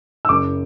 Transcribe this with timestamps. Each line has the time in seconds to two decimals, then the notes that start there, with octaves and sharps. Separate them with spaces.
0.25 E6
0.29 F#1 D6